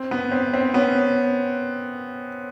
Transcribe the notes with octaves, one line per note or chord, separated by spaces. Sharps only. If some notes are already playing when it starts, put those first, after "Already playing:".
Already playing: C4
B3
C4
C4
B3 C#4